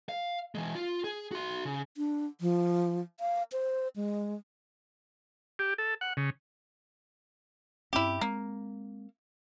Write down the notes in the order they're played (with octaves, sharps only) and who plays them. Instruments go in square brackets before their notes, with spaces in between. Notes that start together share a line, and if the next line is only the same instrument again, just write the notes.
[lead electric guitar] F5
E3 G#3
F4
G#4
F#4 C6
C#3
[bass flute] D4
F3
F5
C5
G#3
[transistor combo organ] G4
A4
F#5
C#3
[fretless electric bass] G2 C4 C#4 [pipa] E4 G4
[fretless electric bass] G#3 C4 [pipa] A#3